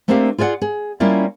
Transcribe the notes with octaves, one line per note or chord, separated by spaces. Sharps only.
A3 A#3 C4 D4 G4 F5
F4 G#4 D5 D#5 F#5
G#4
G3 A#3 C#4 E4 F4 D5